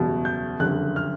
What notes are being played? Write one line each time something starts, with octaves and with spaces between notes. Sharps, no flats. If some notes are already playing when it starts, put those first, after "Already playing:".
Already playing: F#1 E2 B2 G3
G6
F#1 F2 D3 G3 F#6
F6